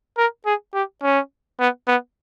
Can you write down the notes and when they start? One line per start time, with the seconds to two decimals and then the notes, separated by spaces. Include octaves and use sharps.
0.17 A#4
0.46 G#4
0.74 G4
1.02 C#4
1.60 B3
1.87 B3